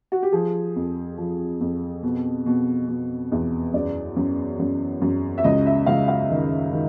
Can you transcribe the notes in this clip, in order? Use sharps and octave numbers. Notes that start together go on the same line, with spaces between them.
F#4
G4
F3 G#4
F2
F3
F2
B2
B2
B2
E2
F#2 D5
F#2
F#2
F#2
E5
C#2 D#5
E5
C#2 F5
F5
D#3
D#3